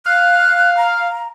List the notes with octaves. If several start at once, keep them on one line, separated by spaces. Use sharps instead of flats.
F5 F#6
A#5